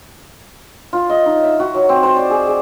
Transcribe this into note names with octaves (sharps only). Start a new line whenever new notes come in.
F4
D#5
D#4
E5
F#4
F#3
C4
C5
D5
G#4
G#4